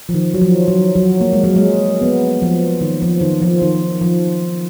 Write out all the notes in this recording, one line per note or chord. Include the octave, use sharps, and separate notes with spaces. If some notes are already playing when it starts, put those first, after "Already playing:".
F3
D#3
F#3
F3
F#3
F#3
A#3
G#3
F#3
G#3
B3
F3
D#3
F3
D#3
F3
D#3
F3